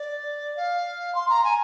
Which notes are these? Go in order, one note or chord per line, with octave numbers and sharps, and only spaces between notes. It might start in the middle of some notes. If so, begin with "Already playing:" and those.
Already playing: D5
F5
C6
A#5
G#5